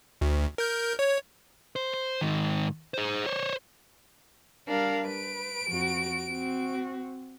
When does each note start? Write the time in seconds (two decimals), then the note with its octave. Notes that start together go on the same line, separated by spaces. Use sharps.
0.21 D2
0.58 A#4 G6
0.99 C#5
1.76 C5
1.94 C5
2.21 G#2 D#3
2.94 G#4 C5
3.26 C5 C#5
4.68 G3 D4 A#4 F5
5.07 B4 D7
5.69 F2 F#4
6.32 C4 F#4